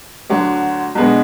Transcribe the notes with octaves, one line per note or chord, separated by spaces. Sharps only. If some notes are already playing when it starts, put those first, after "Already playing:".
D2 D3 F#3
B1 B2 G#3 B3 D4